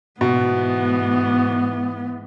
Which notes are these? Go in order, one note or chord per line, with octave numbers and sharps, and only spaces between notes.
G#2 B2 E3 B3